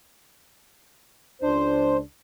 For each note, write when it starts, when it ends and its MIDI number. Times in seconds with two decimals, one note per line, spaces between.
1.42 2.00 37
1.42 2.00 62
1.42 1.97 72